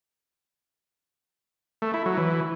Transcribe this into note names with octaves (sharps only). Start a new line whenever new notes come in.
A3
E4
F#3
E3